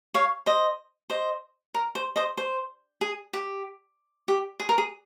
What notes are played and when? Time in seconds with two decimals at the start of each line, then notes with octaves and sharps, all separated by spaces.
0.14 C#5 F5
0.46 C5 D#5
1.10 C5 D#5
1.74 A#4
1.95 C5
2.16 C5 D#5
2.37 C5
3.01 G#4
3.33 G4
4.28 G4
4.60 G#4
4.69 A#4
4.78 G#4